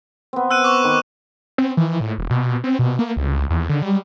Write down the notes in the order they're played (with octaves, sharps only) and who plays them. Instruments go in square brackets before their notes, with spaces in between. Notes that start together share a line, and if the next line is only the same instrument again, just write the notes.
[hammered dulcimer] B3 C4
[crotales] E6 F#6 D#7
C#6 D6
[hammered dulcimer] D#3
[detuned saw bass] C4
E3
A2
E1
B2
C4
B2
A#3
C#2
E2
D3
G3